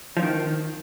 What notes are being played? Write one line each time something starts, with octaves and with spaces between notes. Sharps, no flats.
F3
D#3